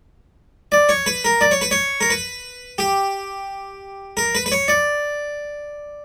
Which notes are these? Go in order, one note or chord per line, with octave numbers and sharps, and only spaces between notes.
D5
C#5
B4
A#4
D5
C#5
B4
C#5
A#4
B4
G4
A#4
B4
B4
C#5
D5